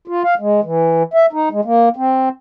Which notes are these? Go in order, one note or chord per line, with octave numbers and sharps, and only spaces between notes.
F4
F5
G#3
E3
E5
D#4
G#3
A#3
C4